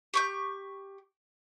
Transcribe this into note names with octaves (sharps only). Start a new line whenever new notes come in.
G4 C#6 G6